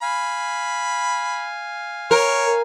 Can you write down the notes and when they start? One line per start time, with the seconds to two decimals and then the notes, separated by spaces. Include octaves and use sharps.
0.02 F5 G#5 B5
2.11 A#4 C#5